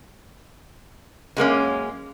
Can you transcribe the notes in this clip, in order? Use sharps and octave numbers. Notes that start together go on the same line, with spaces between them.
F#2 G#3 A#3 C#4